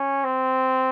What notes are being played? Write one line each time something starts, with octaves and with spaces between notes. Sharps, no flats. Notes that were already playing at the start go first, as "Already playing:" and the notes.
Already playing: C#4
C4